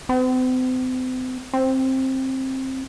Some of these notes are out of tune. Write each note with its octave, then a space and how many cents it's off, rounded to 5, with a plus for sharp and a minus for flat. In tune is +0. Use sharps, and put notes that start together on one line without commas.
C4 -40
C4 +15